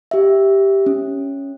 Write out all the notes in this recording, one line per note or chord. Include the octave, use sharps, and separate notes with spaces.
G4 E5
C#4